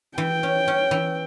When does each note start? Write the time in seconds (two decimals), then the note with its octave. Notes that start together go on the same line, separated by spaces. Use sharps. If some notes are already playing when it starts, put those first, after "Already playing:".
0.18 E3 G5
0.43 C#4
0.68 C#4
0.91 E3